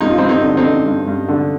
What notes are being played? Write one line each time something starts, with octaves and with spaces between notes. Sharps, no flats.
G2 D#4
F4
C4 D#4
G2
C4 D#4
D3
C4 D#4
D3
G2
G2
D3